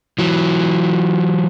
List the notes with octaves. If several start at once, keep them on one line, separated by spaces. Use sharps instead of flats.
E3 F#3